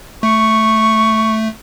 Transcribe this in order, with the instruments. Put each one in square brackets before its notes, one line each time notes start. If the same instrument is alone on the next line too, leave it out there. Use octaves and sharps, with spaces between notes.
[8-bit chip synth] A3 [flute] C#6